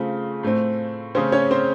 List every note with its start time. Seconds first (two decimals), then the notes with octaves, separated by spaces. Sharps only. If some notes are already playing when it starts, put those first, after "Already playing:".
Already playing: C#3 A3 C4 F4
0.43 A2 A3 C4
1.15 C#3 A3 C4 C#4 C5
1.32 C#4 C#5
1.51 C4 C5